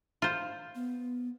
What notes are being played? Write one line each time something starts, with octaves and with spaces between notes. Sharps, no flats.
F4 C5
B3